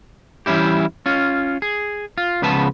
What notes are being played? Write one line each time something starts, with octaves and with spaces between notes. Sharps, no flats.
E3 G3 C#4 E4 G4
C#4 F4
G#4
F4
C#2 C#3 F3 B3 B4 A5